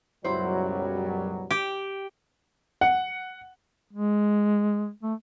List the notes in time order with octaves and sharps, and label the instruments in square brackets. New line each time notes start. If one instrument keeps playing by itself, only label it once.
[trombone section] C#2 B2 F#3 [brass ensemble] F#2 G3 [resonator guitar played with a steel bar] E4 C5
[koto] G4
[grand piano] F#5
[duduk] G#3
A3